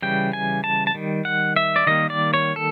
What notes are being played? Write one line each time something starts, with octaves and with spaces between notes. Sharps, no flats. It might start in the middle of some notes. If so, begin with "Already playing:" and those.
C#3 E3 G3 G5
G#5
A5
A5
D#3 G3
F#5
E5
D5
D#3 G3 A#3 D#5
D5
C#5
A4